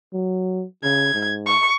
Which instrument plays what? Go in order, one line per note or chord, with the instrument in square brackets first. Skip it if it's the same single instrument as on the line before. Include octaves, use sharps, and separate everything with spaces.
[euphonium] F#3
[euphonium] C#3 [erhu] G#6
[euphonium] G#2
[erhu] C#6